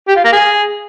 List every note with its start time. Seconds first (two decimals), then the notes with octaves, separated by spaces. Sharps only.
0.08 G4
0.16 F4
0.24 A#3
0.32 G#4